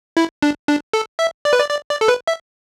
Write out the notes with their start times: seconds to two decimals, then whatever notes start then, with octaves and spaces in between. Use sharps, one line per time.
0.17 E4
0.42 D4
0.68 D4
0.93 A4
1.19 E5
1.45 D5
1.53 B4
1.60 D5
1.70 D5
1.90 D5
2.01 A4
2.08 B4
2.27 E5